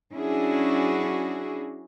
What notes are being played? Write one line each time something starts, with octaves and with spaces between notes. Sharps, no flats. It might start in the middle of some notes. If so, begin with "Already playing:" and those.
F#3 C#4 D4 E4 F#4 G#4